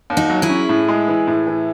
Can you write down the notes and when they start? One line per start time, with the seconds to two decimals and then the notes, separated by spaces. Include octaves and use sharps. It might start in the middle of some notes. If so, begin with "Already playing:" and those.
0.10 D#2
0.17 D#4 F#4
0.30 F#3
0.42 E4 G#4
0.49 C#4
0.69 A2
0.88 G#3
1.08 E3
1.27 A2
1.47 E3